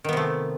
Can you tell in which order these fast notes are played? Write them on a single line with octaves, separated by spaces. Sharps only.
D#3 B3 C3 A3